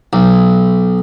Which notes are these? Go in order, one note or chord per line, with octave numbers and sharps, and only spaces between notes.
B1